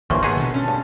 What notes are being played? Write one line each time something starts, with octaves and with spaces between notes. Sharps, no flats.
G#1 G2 E3 F3 A#3 C#5 C6 C#6
G#3 A3 B3 D#4 G#4 B4
B2 D3
C#4 A4
G2